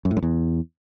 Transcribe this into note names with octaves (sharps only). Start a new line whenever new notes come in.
F#2
A2
F#2
E2